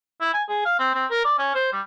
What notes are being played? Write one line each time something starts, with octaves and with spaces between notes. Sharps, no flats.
E4
G#5
G#4
F5
C4
C4
A#4
D5
C#4
C5
G3